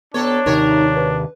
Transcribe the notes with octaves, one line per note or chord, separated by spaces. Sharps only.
B2 B3 D4 A4 C#5
D#2 C3 D#3 D#4 A#4 C#5
B4